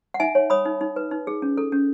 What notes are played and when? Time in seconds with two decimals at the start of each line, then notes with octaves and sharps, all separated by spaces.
0.14 F#5
0.20 D#4 E5 G#5
0.35 C#5
0.50 C#5 B5 D#6
0.65 D#4
0.81 D#4
0.96 B4
1.11 D#4
1.27 G#4
1.42 C#4
1.57 A4
1.72 C#4